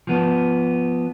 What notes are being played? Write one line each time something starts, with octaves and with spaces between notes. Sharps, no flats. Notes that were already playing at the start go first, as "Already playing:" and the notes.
F3 B3